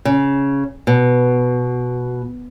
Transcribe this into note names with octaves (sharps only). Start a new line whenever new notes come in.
C#3
B2